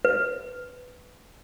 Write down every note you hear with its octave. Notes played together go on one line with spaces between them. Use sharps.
B4